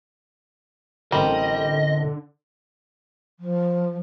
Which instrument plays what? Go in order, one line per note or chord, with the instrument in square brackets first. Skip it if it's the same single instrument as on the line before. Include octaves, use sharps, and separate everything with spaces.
[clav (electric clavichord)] A1 C4 A#4 [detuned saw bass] D3 [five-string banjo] G3 [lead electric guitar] D#5
[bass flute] F3